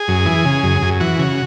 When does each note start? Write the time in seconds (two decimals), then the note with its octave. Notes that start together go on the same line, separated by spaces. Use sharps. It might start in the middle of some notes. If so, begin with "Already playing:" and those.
Already playing: G#4
0.08 F#2
0.26 E3
0.45 C#3
0.63 F#2
0.82 F#2
1.00 E3 F#4
1.19 C#3